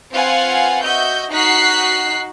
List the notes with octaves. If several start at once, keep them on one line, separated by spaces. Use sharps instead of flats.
C4 F4 B4 F5 F#5 G#5
F#4 D#5 E5 G6
D#4 F#4 F#6 B6 C7